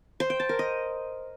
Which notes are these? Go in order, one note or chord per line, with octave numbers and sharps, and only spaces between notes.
C5
G5
A5
A#4
D#5